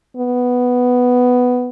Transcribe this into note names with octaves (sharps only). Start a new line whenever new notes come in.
B3